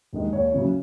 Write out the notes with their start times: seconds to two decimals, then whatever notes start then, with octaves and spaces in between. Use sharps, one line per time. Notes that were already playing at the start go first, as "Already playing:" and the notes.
0.13 D#2 D#3 G#3
0.33 D#2 C#5
0.52 C#3 F#3 C#4 E4